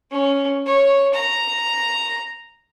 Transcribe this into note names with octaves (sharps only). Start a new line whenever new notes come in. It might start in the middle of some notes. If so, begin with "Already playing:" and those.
C#4
C#5
A#5